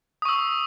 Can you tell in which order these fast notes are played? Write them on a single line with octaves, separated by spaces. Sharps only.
D#6 C#6 E6